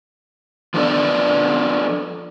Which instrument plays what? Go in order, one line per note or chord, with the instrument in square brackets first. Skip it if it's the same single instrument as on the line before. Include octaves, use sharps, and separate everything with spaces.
[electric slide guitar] F3 B3 D4 A4 D5